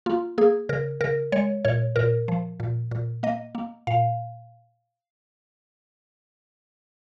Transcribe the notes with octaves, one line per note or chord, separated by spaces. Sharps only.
A#3 F4
A#3 G#4
C#3 A#4
C#3 A#4
G#3 C#5
A#2 C#5
A#2 A#4
F3
A#2
A#2
A#3 D#5
A#3
A#2 F5